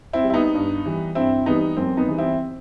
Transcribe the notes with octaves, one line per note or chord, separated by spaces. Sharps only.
C4 E4
G3
E4
B3 D#4
G2
E3 G3
G2 C4 E4
E3 G3 B3 D#4
F#2 C4
B3 D#4
E3 G3
C4 E4